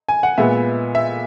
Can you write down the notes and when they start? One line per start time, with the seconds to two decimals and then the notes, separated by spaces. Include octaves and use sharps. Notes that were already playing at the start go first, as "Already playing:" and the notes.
0.09 G#5
0.23 F#5
0.38 A#2 G#3 B3 E5
0.95 E5